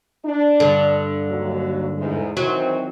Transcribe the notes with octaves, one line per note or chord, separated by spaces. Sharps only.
D4
G2 D3
D#2 F#3
E2 G#2
D#3 E3 F#3 C4